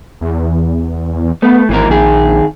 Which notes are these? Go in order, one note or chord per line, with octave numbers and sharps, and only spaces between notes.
E2
A3 B3
G#1 E3 A#3 A#4
A#1 D#3 G#4